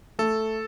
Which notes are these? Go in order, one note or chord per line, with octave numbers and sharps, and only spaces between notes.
A3 A4